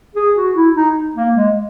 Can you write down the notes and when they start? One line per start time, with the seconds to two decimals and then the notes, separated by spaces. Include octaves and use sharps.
0.16 G#4
0.36 F#4
0.55 E4
0.76 D#4
1.15 A#3
1.35 G#3